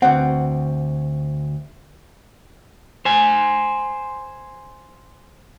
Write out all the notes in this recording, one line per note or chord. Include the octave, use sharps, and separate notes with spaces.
D2 C4 F#5
C5 G#5